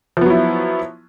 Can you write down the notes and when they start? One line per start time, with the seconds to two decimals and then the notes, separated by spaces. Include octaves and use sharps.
0.17 F3
0.21 B3
0.26 F#3
0.30 E4